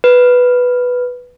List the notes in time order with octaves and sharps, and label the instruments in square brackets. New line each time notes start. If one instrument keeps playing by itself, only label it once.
[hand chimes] B4